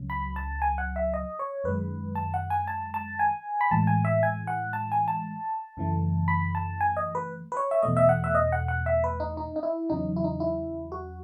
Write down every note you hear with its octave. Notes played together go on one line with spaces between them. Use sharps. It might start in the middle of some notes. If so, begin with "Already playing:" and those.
Already playing: C#2 C#3 F#3
B5
A5
G#5
F#5
E5
D#5
C#5
F#2 D#3 G#3 B4
A5
F#5
G#5
A5
A5
G#5
B5
A2 E3 G#3 A5
G#5
E5
G#5
F#5
A5
G#5
A5
F#2 C#3 E3 A3
B5
A5
G#5
D#5
B4
B4
C#5
E5
E2 B2 A3 D#5
E5
F#5
E5
D#5
F#5
F#5
E5
B4
D#4
D#4
D#4
E4
E2 C#3 F#3 D#4
E4
D#4
E4
F#4